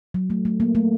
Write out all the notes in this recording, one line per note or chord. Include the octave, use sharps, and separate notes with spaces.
F#3
A3
A3
A#3
A3